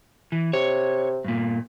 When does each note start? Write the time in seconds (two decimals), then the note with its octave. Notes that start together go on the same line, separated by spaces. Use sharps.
0.32 E3
0.53 C3 C#5
1.25 G2 A#2